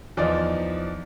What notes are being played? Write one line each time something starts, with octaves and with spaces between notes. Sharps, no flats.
E2 F3 D#4 D5